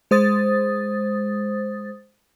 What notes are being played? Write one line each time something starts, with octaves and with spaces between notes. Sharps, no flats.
G#3 C5 D#6 A6